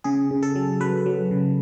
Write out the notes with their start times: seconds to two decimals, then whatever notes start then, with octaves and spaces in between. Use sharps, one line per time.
0.04 C#3 G#4
0.31 C#3
0.43 A4
0.55 F#3
0.80 F#3 B4
1.06 F#3
1.31 C#3